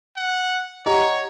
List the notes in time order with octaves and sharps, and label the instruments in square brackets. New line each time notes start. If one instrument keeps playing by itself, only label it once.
[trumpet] F#5
[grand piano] G4 A#5 [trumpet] C#5 [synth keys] D#5 F#5